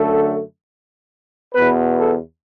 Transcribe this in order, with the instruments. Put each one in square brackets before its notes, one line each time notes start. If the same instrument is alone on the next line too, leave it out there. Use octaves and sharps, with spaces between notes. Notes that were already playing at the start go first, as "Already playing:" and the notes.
Already playing: [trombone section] F#2 D3 A3 A4
E2 B2 B3 B4
A4